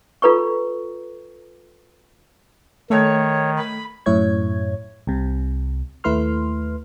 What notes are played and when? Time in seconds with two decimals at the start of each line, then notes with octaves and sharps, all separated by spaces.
0.22 F4 A4 B4 A#5 C#6
2.90 D#3 A3 C#5
3.56 B5
4.06 F#2 A2 E4 C#5 G#6
5.07 C2 C3
6.04 D#2 A3 E4 B4 C6 F6